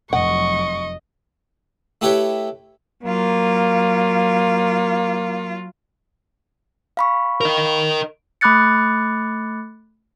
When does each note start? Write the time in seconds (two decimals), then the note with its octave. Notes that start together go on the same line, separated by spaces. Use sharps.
0.13 F1 F#3 D#5 F#5 C#6
2.01 A3 E4 G4 B4 C#5 G5
3.03 F#3 A#3 F4
6.97 F5 B5 C#6
7.41 A#4 D#5
8.41 A3 B5 D6 F#6 A6 C#7